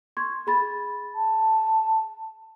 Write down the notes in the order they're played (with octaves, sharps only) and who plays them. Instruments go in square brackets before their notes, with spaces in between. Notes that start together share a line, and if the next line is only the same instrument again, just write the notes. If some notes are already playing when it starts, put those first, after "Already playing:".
[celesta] C6 C#6 G#6
G#4 B5 A6
[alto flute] A5